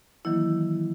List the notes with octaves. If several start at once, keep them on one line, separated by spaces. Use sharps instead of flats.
D#3 E3 F#3 A#3 E4